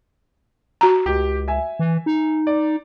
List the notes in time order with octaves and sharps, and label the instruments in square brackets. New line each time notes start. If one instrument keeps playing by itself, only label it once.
[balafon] F#4 A#5
[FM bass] C#2 [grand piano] G4
[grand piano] E5 G#5
[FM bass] E3
D#4
[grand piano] D5